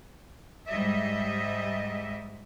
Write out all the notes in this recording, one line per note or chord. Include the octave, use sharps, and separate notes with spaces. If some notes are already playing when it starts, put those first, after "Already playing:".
G#2 G3 D#5 E5